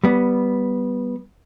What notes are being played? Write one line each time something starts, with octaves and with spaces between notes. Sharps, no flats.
G3 B3